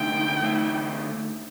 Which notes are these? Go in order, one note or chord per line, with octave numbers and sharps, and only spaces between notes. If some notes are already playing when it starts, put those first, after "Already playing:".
Already playing: D3 A3 D#4 G5
D3 A3 D#4